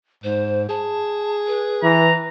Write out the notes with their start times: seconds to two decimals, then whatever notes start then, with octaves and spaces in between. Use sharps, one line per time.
0.24 G#2 C5
0.69 G#4 A5
1.47 B4
1.83 E3 A#5